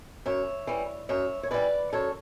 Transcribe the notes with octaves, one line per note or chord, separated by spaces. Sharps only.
F#2 C#5 E5
E3 G3
F#2 C#5 E5
C#5
E3 G3 B4 D5
F#2 A4 C#5